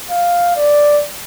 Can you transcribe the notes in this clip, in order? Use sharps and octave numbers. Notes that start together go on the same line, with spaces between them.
F5
D5